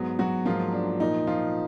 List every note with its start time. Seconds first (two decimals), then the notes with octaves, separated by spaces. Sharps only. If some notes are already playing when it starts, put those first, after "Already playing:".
Already playing: G#2 F#3 B3
0.19 F#3 F#4
0.45 G#2 F3 F#3 A#3 F4
0.73 D4
1.00 A#2 F3 A#3 D#4
1.27 F3 F4